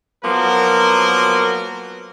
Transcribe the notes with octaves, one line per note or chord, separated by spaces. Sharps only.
F3 F#3 A#3 B3 A#4